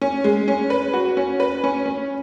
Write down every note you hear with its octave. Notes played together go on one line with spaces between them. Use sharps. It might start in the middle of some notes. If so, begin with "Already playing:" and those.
C#4
G#3
C#4
B4
F#4
C#4
B4
C#4
C#4